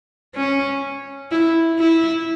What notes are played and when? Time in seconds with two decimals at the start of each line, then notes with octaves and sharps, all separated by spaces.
0.35 C#4
1.31 E4
1.78 E4